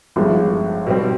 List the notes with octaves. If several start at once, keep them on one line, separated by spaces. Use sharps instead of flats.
G1 G2 F3 G#3
B2 G3 C4